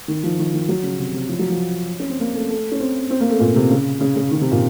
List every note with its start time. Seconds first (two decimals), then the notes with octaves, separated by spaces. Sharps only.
0.08 D#3
0.23 F3
0.38 D#3
0.54 D#3
0.69 F#3
0.83 C#3
0.99 C3
1.14 C3
1.29 F3
1.39 F#3
1.50 F3
2.00 C#4
2.10 C4
2.20 A#3
2.35 A3
2.50 A3
2.72 C#4
2.80 C4
3.10 C4
3.21 A#3
3.30 A3
3.40 A#2
3.56 C3
3.71 C#3
4.01 C#3
4.16 C#3
4.31 D#3
4.41 C3
4.52 A#2